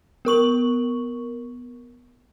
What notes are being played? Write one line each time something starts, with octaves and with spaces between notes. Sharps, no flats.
B3 A#4 C#6 F#7